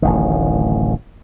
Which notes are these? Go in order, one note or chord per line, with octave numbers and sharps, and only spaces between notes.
D1 A1 D#3